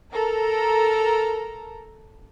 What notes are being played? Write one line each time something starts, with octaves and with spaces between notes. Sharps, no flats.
A4 A#4 A#5